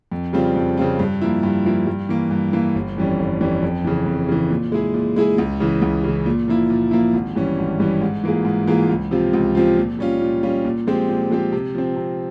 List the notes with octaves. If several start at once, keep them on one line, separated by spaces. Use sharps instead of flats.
F2
C#3 G3 C4 F4
F2
C#3 G3 C4 F4
G2
F3 A#3 E4
G2
F3 A#3 E4
G2
E3 A#3
G2
E3 A#3
G1
F2 E3 G3 C#4
G1
F2 E3 G3 C#4
F2
C#3 E3
F2
C#3 E3
A#2
G#3 E4 G#4
A#2
G#3 E4 G#4
C#2
C#3 E3
C#2
C#3 E3
A#2
F3 A#3 E4
A#2
F3 A#3 E4
G#1
G2 E3 G3 C#4
G#1
G2 E3 G3 C#4
G#2
E3 A#3 F4 G#4
G#2
E3 A#3 F4 G#4
C#2
C3 F3 C4 F4
C#2
C3 F3 C4 F4
A#2
G3 C#4 F4
A#2
G3 C#4 F4
A#2
F3 G#3 C4 G4
A#2
F3 G#3 C4 G4
C3
F3 C4
C3